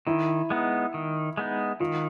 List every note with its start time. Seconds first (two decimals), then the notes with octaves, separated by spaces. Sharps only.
0.07 D#3 E4
0.50 G#3 B3 D#4
0.94 D#3
1.37 G#3 B3 D#4
1.80 D#3 F4